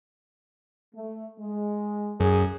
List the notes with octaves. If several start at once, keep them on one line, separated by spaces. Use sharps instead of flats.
A3
G#3
F#2 G#4